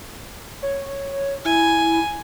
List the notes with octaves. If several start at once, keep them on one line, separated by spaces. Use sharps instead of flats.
C#5
E4 G#5